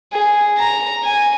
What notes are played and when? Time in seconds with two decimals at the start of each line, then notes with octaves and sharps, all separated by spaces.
0.13 G#4
0.58 A#5
1.04 G#5